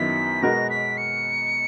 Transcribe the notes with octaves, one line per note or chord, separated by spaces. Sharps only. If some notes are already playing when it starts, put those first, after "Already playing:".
Already playing: F#2 D#3 F#3 B3 E4 B6
B2 G#3 B3 F#4 A#4 A#6
B6
C#7